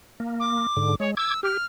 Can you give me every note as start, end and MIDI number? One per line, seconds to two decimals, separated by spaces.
0.20 0.67 58
0.40 0.95 86
0.77 0.95 44
0.77 0.95 50
1.00 1.15 56
1.00 1.11 73
1.17 1.34 86
1.17 1.40 88
1.17 1.34 92
1.43 1.57 67
1.43 1.66 89